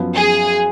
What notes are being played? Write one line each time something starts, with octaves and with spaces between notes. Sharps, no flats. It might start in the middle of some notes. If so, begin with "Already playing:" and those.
Already playing: F#2 F3 B3
G#4